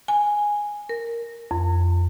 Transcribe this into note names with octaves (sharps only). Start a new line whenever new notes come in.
G#5
A#4
F2